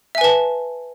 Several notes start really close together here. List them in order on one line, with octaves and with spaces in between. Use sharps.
E5 G#5 B4 A5